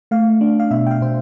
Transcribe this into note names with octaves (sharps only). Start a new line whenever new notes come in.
A3 F5
D4
F5
B2 E5
G5
F5
B2 C5